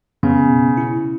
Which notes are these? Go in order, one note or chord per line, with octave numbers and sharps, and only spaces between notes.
C#3 B3
B2
E4